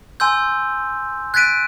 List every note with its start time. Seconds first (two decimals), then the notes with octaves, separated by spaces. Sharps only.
0.20 G#5 C6 E6 G6
1.34 F#6 G#6 A6 B6 D7 D#7